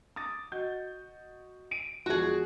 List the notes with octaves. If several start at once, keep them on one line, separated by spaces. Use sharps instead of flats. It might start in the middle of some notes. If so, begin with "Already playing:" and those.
D6 D#6 A6
F#4 D#5 G6
D7 D#7
E1 F3 F#4 G#4